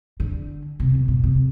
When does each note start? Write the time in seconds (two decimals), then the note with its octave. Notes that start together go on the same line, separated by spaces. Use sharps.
0.20 D3
0.80 C3
0.95 B2
1.08 B2
1.24 C3